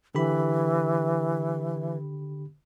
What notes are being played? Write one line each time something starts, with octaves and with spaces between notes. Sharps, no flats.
D3 E3 G4 B5